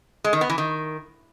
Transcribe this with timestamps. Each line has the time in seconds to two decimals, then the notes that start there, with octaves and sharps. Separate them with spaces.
0.24 G#3
0.33 D#3
0.41 B3
0.50 E3
0.58 D#3